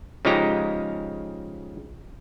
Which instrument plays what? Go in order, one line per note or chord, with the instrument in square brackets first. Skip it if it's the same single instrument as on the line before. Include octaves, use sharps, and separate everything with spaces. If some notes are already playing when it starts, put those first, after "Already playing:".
[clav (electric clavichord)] C#3 F3 G#3 D#4 G4 A#5